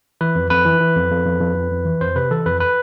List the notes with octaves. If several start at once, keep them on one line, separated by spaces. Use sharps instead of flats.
E3 B4
F2
F2 B4
E3
E3
F2
F2
F2
F2
F2
F2
E3
F2 C5
C3 B4
E3 A4
F2 B4
B4